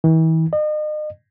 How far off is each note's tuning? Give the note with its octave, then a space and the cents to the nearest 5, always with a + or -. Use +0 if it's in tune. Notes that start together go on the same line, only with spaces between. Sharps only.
E3 -40
D#5 -40